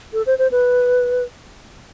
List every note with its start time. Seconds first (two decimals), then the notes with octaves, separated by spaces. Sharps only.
0.13 A4
0.27 C5
0.38 C5
0.51 B4